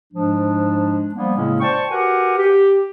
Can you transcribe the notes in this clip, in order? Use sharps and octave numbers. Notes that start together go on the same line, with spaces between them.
G#2 F3 G#3 D4
F3 G3 A#3 B3
A2 C#3 G#3 A#3 C#4 E4
C5 D5 G5 A5 C#6
F#4 G4 A#4 B4 F#5 G#5
G4